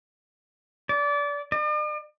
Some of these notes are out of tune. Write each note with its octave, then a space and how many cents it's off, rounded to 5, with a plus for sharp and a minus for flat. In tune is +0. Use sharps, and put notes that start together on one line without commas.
D5 -25
D5 +45